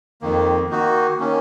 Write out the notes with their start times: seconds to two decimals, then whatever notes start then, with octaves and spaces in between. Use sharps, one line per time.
0.21 F2 D#3 A#3
0.69 D#3 A#3 D#4 F#4
1.18 D#3 A#3 C#4